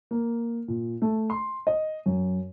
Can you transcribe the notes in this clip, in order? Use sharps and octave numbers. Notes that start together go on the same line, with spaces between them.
A#3
A#2
A3
C6
D#5
F#2